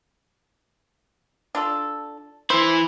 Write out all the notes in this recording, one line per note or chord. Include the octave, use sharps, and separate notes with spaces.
D4 F4 A4
E3 E4 C5 C6